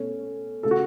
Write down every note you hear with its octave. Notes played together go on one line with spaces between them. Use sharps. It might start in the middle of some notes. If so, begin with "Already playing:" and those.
Already playing: B2 A3 C#4
C#3 A3 A4
F#4